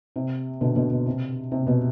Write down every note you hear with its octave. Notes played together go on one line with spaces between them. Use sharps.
C3
B2 D3
B2 D3
B2
C3
C3
B2